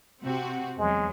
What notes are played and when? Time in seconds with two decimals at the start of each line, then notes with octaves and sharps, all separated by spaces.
0.23 C3 C4 F#4
0.79 E2 F#3 G#3